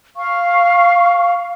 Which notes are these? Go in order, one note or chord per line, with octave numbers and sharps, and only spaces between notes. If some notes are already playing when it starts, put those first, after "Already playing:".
F5 C#6